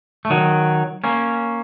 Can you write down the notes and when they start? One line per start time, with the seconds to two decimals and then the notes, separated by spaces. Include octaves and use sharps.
0.25 A3
0.30 D#3 F#3
1.04 A#3 C#4